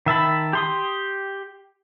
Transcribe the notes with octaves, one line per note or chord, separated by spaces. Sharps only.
D#3 E5 A5 B5
G4 C6 D#6